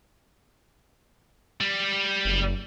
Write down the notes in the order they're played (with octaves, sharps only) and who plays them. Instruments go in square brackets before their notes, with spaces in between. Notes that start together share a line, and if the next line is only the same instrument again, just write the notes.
[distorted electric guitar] G3
[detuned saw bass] F#1